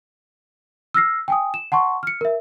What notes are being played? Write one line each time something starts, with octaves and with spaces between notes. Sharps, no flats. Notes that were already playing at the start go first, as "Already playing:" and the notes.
E6 F6 A#6 C7
G5 G#5 D#6
E7
F#5 A5 C6 C#6
F6 C#7
A#4 E5